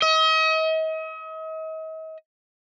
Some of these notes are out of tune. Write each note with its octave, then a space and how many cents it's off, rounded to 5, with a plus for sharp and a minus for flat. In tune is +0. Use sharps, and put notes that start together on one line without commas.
D#5 +40